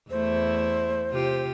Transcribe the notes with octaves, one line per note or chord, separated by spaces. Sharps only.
E2 A3 E4 C5
C3 F4 G4